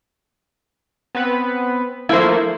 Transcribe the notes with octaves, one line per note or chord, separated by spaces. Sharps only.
B3 C4 B4
F3 A3 A#3 E4 C5